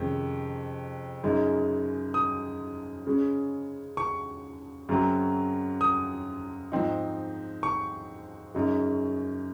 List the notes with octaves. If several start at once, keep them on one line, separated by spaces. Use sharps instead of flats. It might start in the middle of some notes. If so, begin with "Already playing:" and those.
Already playing: F2 C3 D#3 G#3 C#4
F#2 C#3 G#3 D#4
D#6
C#3 G#3 C#4
C#6
F#2 C#3 F#3 C4
D#6
G#2 F3 C4 D#4
C#6
F#2 C#3 G#3 D#4